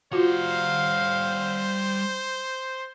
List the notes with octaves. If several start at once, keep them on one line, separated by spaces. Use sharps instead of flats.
G3 F4 F#4 C5 F5 F#5